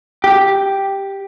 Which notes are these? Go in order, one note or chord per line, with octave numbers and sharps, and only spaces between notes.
G4